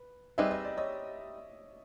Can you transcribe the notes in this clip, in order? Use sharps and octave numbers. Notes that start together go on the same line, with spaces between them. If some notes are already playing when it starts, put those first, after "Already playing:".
Already playing: B4
G3 C4 D#4 G#4 B4 E5
D#5
D5
C#5 D#5